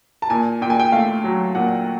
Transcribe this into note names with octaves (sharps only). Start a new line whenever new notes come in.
A5
A#2 G#5
A#2 G5
G#5
G5
A3 F5
F#3
A#2 F#5